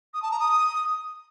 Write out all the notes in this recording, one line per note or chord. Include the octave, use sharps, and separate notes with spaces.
D#6
A5
A#5
D#6